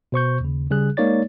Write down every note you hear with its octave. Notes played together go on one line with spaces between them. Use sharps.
B2 C5 C#6 G6
D#2 C#3
C#3 G3 G#4 F#6
G#3 A#3 D#4 C#5 D5 A6